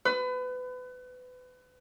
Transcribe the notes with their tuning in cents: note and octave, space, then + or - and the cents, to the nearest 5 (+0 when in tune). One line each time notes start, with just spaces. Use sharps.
B4 +30